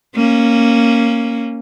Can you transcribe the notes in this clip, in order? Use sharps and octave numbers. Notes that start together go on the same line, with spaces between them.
A#3 C#4